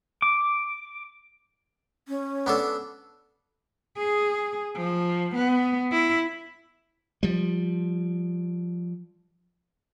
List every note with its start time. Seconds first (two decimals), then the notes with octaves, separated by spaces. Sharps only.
0.22 D6
2.08 C#4
2.46 B3 D4 A4
3.97 G#4
4.76 F3
5.36 B3
5.92 E4
7.23 F3 G3